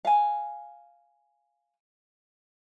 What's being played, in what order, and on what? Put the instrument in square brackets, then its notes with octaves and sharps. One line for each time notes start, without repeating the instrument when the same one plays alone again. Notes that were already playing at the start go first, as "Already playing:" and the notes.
[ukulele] F5 G#5